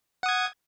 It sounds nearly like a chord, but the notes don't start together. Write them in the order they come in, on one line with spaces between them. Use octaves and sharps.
F#5 D#6 G#6